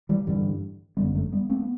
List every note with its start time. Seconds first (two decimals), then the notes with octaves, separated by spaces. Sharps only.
0.09 E3 G3
0.27 A1 G2 D3 E3 G3
0.97 G1 F#2 D3 G3 B3
1.15 F#3 A3
1.32 G3 B3
1.50 A3 C4
1.60 B3